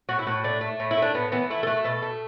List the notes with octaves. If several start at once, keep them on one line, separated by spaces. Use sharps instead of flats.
A2 F#4
E4
A2 F#4
A3 D4
A3
A2
E4
A3
D4
A2 B3
E3 B3
A3 E4
A4
A3 F#4
B2 A4
A3